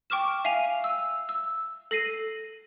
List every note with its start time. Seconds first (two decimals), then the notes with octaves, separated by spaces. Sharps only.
0.10 G5 C#6 D6 F6 E7
0.45 E5 F5 G#5 D#7 F7
0.84 E6
1.29 E6
1.91 A4 A#6 C7 D#7